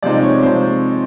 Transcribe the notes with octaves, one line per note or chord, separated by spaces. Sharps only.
C3 F3 G#3 C4 D#4 D5
C#5
C3 F3 G#3 C4 C5